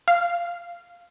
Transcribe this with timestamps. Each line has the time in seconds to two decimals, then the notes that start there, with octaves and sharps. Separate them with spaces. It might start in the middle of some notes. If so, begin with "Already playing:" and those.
0.08 F5